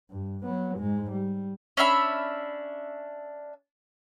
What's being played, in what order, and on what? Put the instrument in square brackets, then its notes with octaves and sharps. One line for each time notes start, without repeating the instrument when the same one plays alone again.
[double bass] G2
F#3 B3
G#2 G#3
G3
[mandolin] C#4 D4 E5 B5